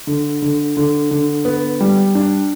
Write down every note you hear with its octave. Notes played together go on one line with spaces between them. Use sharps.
D3
D3
D3
D3
B3
G3
D4